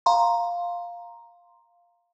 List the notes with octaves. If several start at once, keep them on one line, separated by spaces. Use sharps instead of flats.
F5 A#5 C6